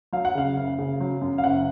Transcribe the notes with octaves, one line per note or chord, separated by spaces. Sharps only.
F#3 F5
F#5
C#3 F5
F#1
C#3
F#3
F#2
F5
F#1 F#5